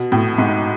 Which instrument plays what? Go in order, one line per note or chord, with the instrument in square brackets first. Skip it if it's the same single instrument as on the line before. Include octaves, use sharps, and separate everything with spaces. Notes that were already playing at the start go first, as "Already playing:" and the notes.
Already playing: [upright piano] B2
A2
G#2